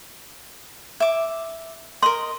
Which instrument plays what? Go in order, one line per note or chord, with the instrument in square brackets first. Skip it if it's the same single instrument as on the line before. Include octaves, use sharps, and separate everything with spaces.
[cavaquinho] E5 D6
[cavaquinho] A#4 D#5 [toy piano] C6